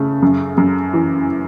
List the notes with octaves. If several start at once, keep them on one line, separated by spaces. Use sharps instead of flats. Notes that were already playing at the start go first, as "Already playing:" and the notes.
Already playing: C#3 A3
F#2
F#2
E3